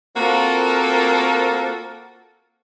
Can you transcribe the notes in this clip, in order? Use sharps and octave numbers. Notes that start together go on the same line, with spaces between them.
A#3 C4 F4 F#4 A4 A#4